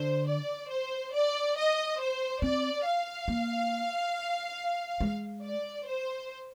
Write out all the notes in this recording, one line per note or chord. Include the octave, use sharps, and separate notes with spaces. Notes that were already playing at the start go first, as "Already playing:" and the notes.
Already playing: D3 C5
D5
C5
D5
D#5
C5
C4 D5
F5
A#3
G#3
D5
C5